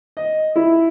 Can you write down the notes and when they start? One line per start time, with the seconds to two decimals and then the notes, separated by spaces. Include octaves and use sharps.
0.17 D#5
0.56 E4